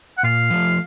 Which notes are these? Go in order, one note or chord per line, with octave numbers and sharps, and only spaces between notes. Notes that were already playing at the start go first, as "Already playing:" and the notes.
F#5
A#2 F5
F3 A3